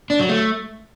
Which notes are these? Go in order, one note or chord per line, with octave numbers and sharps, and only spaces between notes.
D4
F#3
A3